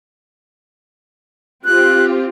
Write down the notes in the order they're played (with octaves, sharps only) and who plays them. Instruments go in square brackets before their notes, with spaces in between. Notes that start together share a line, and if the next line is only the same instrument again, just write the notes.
[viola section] C4 F4 G4 [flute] F#6